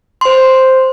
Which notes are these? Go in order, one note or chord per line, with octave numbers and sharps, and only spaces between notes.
C5 C6